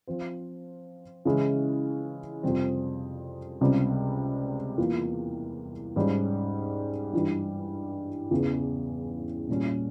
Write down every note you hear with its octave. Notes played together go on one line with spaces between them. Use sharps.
F3 C4 F4 C5
C#3 E3 G#3 C#4 E4
F2 C3 G3 C4
C#2 C3 G3
E2 E3 A#3 F4
G#2 G3 C#4
G2 E3 G3
E2 C#3 E3
A#2 G3 C#4